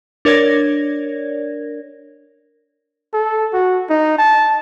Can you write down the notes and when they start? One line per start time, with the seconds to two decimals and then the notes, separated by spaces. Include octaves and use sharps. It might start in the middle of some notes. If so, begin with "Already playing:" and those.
0.25 D4 A#4 C#5 D5 G#6 A#6
3.14 A4
3.53 F#4
3.90 D#4
4.19 A5